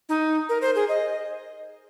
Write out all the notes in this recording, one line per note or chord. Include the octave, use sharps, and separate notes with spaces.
D#4
A#4
C5
G#4
D#5